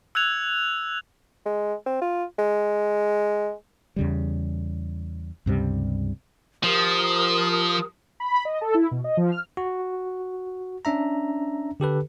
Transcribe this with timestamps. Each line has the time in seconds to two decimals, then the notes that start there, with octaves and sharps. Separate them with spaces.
0.15 E6 F#6 G#6 F7
1.46 G#3
1.86 C4
2.01 F4
2.39 G#3
3.96 E2 C#3 G3
5.46 C#2 G2 C3 G3
6.63 F3 G4 A#4 D#6
8.20 B5
8.45 D#5
8.61 A4
8.74 E4
8.91 B2
9.04 D#5
9.17 F3
9.32 F6
9.57 F#4
10.85 C#4 D4 E5 A#5
11.80 D3 G4 A4 B4